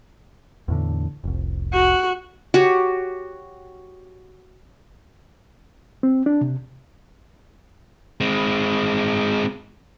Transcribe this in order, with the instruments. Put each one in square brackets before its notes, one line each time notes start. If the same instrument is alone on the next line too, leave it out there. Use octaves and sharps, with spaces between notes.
[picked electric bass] E2 A2 D3
F1 C2
[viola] F#4
[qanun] F#4 G4 C#5
[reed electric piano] C4
D4
C3
[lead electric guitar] G#3 C4